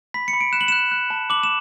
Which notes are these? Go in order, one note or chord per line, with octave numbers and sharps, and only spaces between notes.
B5 B6
C#7
B5
D7
F#6 E7
F#7
F#6 E7
F#6
A5
D6 F#7
E7